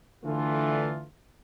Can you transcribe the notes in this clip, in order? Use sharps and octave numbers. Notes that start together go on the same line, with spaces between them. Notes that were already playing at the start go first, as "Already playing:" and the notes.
D3 E3 A3 F4